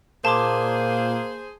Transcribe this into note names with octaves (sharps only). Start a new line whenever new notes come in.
A#2 A#3 G#4 C5 A5 C6 D6